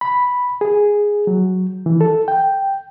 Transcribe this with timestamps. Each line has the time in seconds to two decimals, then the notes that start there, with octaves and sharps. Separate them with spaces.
0.01 B5
0.61 G#4
1.27 F#3
1.86 E3
2.01 A4
2.28 G5